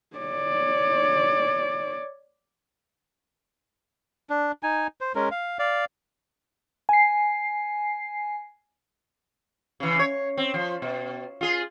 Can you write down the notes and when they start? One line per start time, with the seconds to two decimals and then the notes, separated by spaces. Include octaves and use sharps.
0.17 C#5 D5
4.30 D4
4.63 D#4 G#5
5.01 C5
5.15 G#3 C#4 A#4
5.31 F5
5.59 D5 F5
6.89 G#5 C7
9.80 C#3 E3
9.99 C#5
10.37 C4
10.54 F3
10.82 B2
11.41 F4 G#4